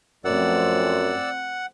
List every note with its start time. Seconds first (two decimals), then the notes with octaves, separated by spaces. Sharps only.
0.25 F#2 F3 A3 C4 D5 F#5 E6